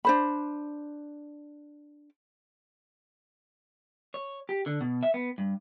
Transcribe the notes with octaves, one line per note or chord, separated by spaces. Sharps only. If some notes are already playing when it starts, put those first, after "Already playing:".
D4 C5 B5
C#5
G4
D3
B2
E5
B3
G2